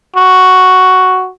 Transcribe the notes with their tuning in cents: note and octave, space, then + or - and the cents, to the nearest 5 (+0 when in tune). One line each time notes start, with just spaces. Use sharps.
F#4 +5